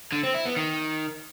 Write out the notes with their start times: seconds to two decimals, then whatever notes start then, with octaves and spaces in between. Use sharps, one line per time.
0.12 D3
0.23 C4
0.34 E4
0.45 B3
0.57 D#3